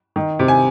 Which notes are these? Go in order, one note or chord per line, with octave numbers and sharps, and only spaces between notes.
D#3
C3
G#5